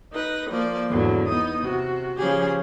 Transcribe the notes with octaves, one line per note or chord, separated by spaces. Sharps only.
D#4 B4 A#6
F3 A#3 D5
E2 G#2 D3 F#3
B3 D#4 D#6
C3 F#4
C#3 F3 C#4 G4 G#4